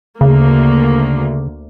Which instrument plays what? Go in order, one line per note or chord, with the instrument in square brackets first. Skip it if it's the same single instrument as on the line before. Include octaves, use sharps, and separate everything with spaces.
[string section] D2 A#3 [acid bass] C#3